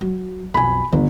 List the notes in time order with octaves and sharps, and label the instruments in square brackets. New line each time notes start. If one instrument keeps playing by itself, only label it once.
[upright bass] F#3
[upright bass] B1 F2 [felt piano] G#5 B5
[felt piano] G1 [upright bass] D2 G2